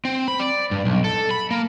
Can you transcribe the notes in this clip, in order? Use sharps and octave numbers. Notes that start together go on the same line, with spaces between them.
C4
B5
D5
G2
B1
A4
B5
A#3